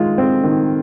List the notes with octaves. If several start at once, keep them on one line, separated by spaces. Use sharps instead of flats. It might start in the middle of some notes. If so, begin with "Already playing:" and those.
Already playing: D#3 G#3 F4
C4
D#3